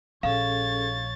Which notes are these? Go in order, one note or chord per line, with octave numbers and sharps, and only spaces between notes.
A#1 C#4 G#4 A4 C#5 F5 A6